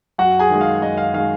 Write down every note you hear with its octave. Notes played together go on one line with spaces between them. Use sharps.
F#2 F#4 F#5
G#4 G#5
D#3 G#3
F5
F#2 D#5
F5
D#3 G#3 F5